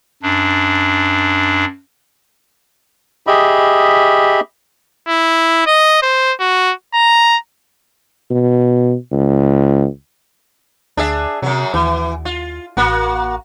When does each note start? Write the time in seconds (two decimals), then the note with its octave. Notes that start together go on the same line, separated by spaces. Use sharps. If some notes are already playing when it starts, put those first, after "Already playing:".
0.23 F#2 D4
3.27 G4 G#4 D#5 E5 B5
5.09 E4
5.67 D#5
6.03 C5
6.40 F#4
6.94 A#5
8.30 B2
9.12 C#2
10.97 D2 D4 G#4 E5
11.42 F#2 C3 F#3
11.74 D#2 E3
12.25 F4
12.77 A1 A#3 F#4